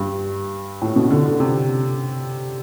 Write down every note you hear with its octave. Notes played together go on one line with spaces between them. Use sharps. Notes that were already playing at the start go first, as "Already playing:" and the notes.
Already playing: G2
A2
B2
D3
D3
C3